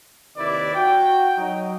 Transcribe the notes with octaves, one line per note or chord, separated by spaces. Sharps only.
D#2 C3 D#3 E4 B4 D5
F#4 G5
F#3 D#4